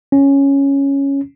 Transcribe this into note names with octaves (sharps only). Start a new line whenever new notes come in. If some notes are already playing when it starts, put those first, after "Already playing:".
C#4